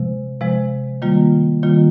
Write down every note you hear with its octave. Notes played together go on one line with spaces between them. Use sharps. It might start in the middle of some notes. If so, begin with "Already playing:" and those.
Already playing: C3 F3 G#3
C3 F3 G#3
D#3 G3 A#3 F4
D#3 G3 A#3 F4